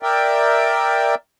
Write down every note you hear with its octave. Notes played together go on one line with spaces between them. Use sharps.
A#4 D5 E5 G5